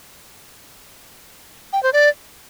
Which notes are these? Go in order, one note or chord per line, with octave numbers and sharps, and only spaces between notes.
G5
C5
D5